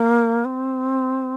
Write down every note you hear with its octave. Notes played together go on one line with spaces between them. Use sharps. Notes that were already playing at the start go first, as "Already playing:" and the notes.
Already playing: A#3
C4